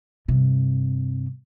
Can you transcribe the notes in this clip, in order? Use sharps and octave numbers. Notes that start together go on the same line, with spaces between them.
G2 C3